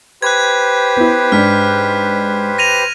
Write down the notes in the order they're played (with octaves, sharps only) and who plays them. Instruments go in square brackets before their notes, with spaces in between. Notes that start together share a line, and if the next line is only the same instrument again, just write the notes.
[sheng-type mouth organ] G4 B4 C5 [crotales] F#6 G#6
[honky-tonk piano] B3 E4
[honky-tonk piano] G#2 D4 [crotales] F6 B6
[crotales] A#6 D#7 F7